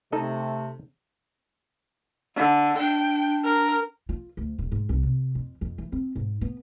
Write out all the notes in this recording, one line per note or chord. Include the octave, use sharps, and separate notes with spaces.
C3 A3 D#4 A4 D#5
D3
D4 G5
A#4
F4
D2
D#1
G#2
C2
C3
F2
F2
E3
C4
G#2
B3